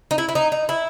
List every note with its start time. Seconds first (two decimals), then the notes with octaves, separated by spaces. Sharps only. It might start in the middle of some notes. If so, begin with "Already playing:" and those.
0.11 D#4
0.18 E4
0.29 E4
0.35 D#4
0.52 D#4
0.69 E4